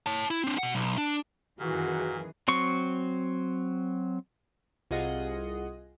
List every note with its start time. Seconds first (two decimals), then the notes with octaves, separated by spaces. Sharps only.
0.06 C#5 A5
0.31 E4
0.44 C4 D4
0.58 B2 F#5
0.75 B1
0.98 D4
1.60 F#2 A#2 D#3 E3 F#4 G#4
2.48 F#3 C4 C#6
4.91 C2 F4 G#4 D#5 F#5